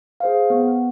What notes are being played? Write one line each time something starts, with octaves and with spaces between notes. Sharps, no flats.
G#4 C5 F5
B3